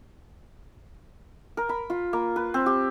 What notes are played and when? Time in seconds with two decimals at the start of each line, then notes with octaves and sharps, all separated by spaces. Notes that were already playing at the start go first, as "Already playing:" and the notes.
1.57 A#4
1.69 B5
1.90 F4
2.13 A#3
2.36 B4
2.54 C4
2.66 G4